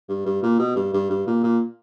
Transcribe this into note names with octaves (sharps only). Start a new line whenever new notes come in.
G2
G2
A#2
B2
G2
G2
G2
A#2
A#2